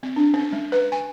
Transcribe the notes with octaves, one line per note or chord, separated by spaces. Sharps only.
C4
D4
C#4
G#3
B4
G#5